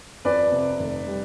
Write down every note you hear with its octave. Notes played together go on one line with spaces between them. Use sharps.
F2 B4 D5
C3
F1
G3